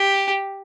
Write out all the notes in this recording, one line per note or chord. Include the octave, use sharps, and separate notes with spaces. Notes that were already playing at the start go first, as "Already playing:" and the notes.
Already playing: G4